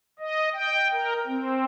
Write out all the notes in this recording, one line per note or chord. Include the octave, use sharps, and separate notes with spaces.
D#5
G5
A#4
C4